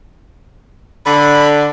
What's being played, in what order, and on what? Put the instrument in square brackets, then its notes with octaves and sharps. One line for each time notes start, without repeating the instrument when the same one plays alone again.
[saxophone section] D3 [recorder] B5